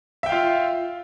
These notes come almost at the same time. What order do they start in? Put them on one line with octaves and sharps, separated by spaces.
E5 G5 F5 F4